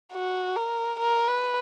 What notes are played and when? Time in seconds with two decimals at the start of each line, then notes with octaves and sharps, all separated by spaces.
0.13 F#4
0.56 A#4
0.99 A#4
1.27 B4